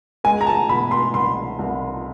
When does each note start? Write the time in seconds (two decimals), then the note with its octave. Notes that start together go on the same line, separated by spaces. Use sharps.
0.24 G#3 G#5
0.41 A#5
0.47 A5
0.69 B2 B5
0.91 C6
1.14 C2 C6
1.59 C2